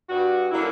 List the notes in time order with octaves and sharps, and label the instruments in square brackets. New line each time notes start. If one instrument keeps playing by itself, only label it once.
[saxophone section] G2 F#4
D3 F#3 A#3 C#4 E4